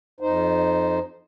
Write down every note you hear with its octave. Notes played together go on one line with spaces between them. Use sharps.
F2 D#4 C5